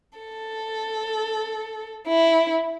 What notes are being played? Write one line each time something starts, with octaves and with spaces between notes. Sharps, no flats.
A4
E4